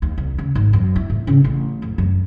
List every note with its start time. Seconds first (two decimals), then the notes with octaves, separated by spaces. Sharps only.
0.02 D#2
0.18 C2
0.38 C#3
0.55 G#1
0.73 F#2
0.96 E4
1.10 A2
1.27 C#3
1.44 A1
1.82 F2
1.98 F#2